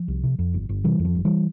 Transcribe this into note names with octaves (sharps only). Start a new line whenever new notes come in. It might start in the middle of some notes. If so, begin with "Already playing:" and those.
Already playing: F3
C2
C3
F2
G1
G1
C3 E3 G3
F2
F3
G1
E3 G3